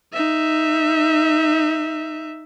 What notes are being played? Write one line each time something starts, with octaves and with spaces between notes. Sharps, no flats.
D#4 E5